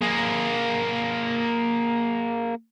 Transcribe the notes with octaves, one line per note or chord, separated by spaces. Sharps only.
A#3 G#4